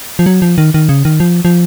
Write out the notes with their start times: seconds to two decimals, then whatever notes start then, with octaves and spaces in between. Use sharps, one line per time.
0.19 F3
0.26 F#3
0.42 F3
0.58 D#3
0.74 D#3
0.89 C#3
1.05 D#3
1.20 F3
1.45 F3